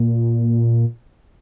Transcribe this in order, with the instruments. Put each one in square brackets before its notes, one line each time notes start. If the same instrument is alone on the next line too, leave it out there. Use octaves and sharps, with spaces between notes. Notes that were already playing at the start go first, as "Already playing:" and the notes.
Already playing: [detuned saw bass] A#2